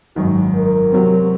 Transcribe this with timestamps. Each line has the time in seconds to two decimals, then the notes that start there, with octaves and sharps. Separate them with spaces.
0.16 G#1 F#2 D#3 F#4
0.54 A#4
0.92 C3 F#3 C4